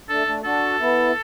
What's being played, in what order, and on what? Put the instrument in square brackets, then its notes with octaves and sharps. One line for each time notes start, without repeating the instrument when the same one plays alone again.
[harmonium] A3 D4 [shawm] A4
[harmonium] A3 D4
[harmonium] D4 F#4 [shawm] A4
[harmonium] B3 E4